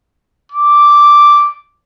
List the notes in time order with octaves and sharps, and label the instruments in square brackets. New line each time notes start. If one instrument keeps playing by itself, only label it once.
[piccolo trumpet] D6